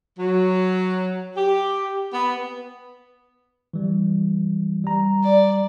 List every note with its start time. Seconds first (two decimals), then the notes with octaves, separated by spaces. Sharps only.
0.19 F#3
1.36 G4
2.13 B3
3.74 E3 G3
4.84 G3 A#5
5.24 D5